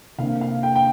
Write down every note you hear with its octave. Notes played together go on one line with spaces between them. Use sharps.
C3 A#3 D4 F5
F5
G5
G5